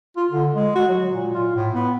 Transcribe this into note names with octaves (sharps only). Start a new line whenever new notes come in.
F4
D3
G#3
F#4
F#3
A#2
F4
A2
B3